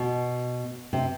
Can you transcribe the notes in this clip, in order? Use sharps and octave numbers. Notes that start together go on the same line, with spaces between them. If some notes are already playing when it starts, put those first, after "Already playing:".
Already playing: B2
C3